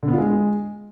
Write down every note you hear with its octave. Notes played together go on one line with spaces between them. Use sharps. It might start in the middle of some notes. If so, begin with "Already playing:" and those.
D3
B3
F4
G#3